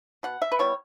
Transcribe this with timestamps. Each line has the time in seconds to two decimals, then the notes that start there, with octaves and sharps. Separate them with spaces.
0.23 B2 F#5
0.42 E5
0.52 B4
0.59 G3 B3 E4 C#5